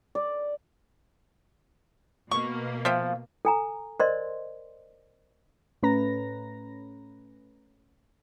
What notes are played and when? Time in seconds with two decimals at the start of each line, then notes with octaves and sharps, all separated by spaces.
0.15 D5
2.31 B2 A#3 C#6
2.85 F3 C5 E5 F5 G5
3.45 A4 G#5 A#5
4.00 A#4 C5 D5 D#5 C6
5.82 A2 A3 C#4 B4 A#5 A#6